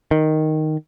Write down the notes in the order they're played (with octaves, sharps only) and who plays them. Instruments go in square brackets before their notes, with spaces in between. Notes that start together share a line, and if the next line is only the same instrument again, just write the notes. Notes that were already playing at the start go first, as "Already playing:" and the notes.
[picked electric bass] D#3